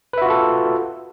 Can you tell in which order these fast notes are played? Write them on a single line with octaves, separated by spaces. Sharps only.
B4 E5 F#4 F4 A4